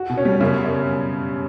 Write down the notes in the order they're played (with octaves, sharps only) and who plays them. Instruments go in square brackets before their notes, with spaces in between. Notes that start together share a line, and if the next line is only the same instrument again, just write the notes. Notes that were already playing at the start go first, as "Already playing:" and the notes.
Already playing: [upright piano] F#4
[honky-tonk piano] B2
[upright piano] C#4
[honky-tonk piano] G3
[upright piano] F#2 [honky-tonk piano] C#3
[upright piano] F#2